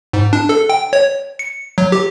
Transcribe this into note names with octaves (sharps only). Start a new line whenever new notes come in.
G#2
D4
A4
G5
C#5
C#7
F#3
G4